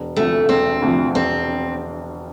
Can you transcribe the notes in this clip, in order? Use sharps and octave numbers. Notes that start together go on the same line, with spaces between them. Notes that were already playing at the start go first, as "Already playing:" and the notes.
Already playing: E1
D2 C3 F3 A3
E1 C4
D2 C3 F3
E1 C4